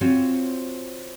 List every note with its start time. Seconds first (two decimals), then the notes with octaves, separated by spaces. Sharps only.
0.01 C4 F4 F#4 C5 C#5